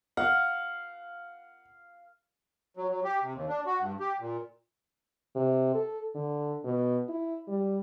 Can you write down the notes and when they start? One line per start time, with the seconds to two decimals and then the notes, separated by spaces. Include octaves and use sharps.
0.17 F5 F#5
2.77 F#3
2.90 F#3
3.04 G4
3.22 C3
3.34 D#2
3.49 D4
3.66 F#4
3.80 G2
4.00 G4
4.20 A#2
5.36 C3
5.75 A4
6.15 D3
6.64 B2
7.09 E4
7.48 G3